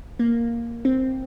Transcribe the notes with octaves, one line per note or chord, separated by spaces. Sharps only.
A#3
C4